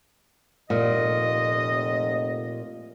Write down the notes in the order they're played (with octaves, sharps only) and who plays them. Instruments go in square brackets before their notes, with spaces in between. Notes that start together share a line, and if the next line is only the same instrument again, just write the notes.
[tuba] F1 [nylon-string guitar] A#2 [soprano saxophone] D#5